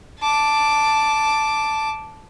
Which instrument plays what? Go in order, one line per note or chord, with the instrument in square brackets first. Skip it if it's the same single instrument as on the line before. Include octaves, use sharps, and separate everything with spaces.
[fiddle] A5 D6